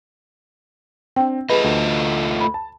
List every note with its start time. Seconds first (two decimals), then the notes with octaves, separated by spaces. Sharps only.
1.16 C4 D4 G5
1.50 A3 F4 G#4 B4 D#5 B5
1.64 D2
2.40 B5
2.54 A5